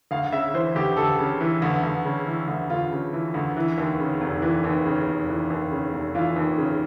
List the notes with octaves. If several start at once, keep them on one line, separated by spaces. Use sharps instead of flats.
D2 F5
C#3 E5
E3 C5
D2 G4
D2 A4
C#3
E3
D2
D2
C#3
E3
D2
D2 F4
C#3
E3
D2
E3
D#2
C#3
F1
E3
D#2
C#3
F1
E3
D#2
C#3
F1
E3 F4
D#2
C#3